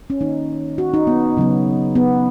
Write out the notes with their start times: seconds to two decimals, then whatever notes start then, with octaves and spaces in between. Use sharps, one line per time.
0.10 C#4
0.20 D#3 A#3 D#4
0.78 F#4
0.94 D#4
1.07 B3
1.37 C#3 F#3 B3
1.95 B3